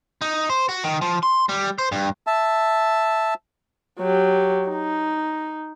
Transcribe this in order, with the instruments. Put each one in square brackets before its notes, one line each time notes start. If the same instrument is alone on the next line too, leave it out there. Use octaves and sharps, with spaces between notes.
[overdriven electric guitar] D#4
C5
F#4
D#3
F3
C6
G3
C5
G2
[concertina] E5 A5
[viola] F#3 G4
D#4